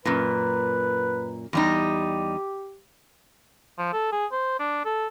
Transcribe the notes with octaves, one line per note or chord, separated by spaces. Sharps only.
F#2 A#2 B4
E2 G3 D#4 G4
F3
A4
G#4
C5
D4
A4